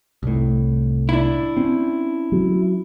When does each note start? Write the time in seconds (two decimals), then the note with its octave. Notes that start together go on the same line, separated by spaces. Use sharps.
0.23 C2 A2
1.09 D4 E4
1.57 C4 C#4
2.32 F#3